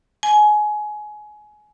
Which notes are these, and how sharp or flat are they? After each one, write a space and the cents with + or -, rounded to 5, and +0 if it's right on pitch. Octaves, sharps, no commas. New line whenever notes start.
G#5 +25